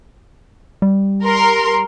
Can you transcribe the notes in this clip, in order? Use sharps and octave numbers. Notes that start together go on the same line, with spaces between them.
G3
A#4 C6